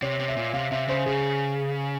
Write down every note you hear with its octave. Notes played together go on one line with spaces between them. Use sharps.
C3 C#5
C3
E5
A#2
C3 F5
C3 E5
C#3 C5
C#3 G#4